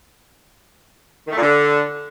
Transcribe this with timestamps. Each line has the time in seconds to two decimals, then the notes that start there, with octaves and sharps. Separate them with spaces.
1.27 D#3
1.32 A3
1.37 A#2
1.42 D3